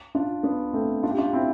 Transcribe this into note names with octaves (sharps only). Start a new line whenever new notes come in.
D4 F4
B3 D4
A3 C4
D4 F4
G4
D4 F4
C4 E4